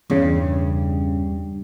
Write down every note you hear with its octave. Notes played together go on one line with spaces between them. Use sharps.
E2 G2 C#3